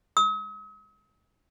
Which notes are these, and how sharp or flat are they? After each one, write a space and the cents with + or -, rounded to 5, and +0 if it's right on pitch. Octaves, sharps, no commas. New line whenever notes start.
D#6 +45